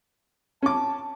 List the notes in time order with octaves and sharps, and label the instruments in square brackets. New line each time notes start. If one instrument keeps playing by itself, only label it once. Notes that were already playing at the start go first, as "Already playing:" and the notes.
[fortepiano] C#4 D6 [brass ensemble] A5